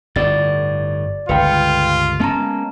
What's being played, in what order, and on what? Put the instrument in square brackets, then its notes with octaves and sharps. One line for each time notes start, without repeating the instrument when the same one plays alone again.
[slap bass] G1 A2 [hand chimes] D5 A6
[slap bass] G1 C#2 [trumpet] F4 [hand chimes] B4 F5 G5
[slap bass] G#3 A#3 C#4 [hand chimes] B3 A5 A#5